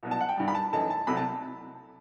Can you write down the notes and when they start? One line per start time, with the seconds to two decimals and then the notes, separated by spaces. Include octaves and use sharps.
0.03 C2 B2 F#3
0.11 A5
0.20 F#5
0.29 G5
0.37 G2 D#3 G3
0.48 B5
0.55 A5
0.73 F#2 E3 A3 D#4 A5
0.90 A5
1.07 C2 C3 F#3 A3 C4 B5
1.17 A5